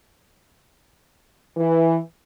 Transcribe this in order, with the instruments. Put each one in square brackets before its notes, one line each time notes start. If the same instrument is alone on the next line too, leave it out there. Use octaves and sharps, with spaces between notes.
[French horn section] E3